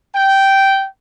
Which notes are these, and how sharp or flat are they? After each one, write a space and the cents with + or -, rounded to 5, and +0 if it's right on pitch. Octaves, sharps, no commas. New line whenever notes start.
G5 -10